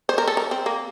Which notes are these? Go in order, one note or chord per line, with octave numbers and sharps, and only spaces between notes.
C5
A#4
A4
A#4
C4
A#3